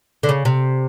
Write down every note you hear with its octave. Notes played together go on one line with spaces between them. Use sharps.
D3
C#3
C3